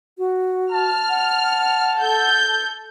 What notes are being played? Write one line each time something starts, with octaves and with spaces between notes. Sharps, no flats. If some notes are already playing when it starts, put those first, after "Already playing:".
F#4
A5 F6
F#5
A4 G6